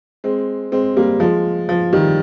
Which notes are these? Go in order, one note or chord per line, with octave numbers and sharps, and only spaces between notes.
G#3 C4
G#3 C4
G3 A#3
F3 G#3
F3
D#3 G3